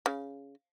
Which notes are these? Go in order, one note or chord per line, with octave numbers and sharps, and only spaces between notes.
C#3